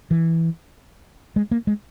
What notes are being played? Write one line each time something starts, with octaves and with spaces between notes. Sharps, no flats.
E3
G#3
A#3
G#3